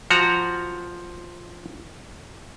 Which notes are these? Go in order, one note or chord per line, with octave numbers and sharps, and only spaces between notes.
F3 F#4 A#5